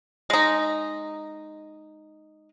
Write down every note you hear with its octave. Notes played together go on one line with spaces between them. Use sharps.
G#3 D#4